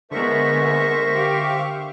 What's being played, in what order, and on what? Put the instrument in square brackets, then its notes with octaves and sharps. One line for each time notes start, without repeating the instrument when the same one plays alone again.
[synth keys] D3 [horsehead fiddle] G#3 B3 [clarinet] A#4 [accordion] C5 E5 C#6
[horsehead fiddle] G4 F5